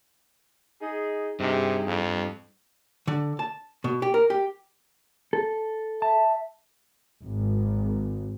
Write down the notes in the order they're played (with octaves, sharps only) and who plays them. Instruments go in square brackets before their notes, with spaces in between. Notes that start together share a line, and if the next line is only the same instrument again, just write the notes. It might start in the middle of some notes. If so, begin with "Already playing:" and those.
[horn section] D#4 G#4
[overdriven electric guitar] G2 [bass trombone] C3 [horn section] D#4 G#4
[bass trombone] F2
[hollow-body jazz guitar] D3
A5
B2
G4
A#4
G4
[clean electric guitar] A4
[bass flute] E5 [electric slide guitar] A5
[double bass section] G#1